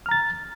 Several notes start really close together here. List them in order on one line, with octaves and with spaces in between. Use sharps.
F6 A#5 A6